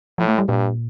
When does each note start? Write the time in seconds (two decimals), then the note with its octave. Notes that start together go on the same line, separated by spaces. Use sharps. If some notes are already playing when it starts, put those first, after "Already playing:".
0.18 A2 F3
0.28 A3
0.38 G3
0.48 G2 A#2